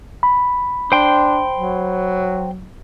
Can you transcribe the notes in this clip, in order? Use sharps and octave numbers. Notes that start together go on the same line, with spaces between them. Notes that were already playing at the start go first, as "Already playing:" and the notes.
B5
D4 C5 G5 C6
F#3